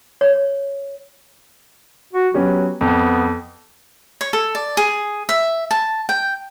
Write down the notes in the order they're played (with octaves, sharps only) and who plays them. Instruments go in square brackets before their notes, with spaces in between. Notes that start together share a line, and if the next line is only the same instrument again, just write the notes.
[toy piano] C#5
[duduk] F#4
[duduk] F#3 [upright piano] B3 C#4 G4
[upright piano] F2 [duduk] B3
[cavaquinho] C#5
A4
D5
G#4
E5
A5
G5